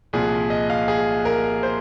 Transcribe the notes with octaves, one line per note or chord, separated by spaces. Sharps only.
C2 A#2 F3 G#4
D#5
F5
G#4
A#4
C5